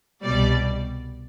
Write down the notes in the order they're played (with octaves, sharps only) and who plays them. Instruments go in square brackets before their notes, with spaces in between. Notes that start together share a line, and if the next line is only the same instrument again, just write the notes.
[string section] C2 B2 G3 D5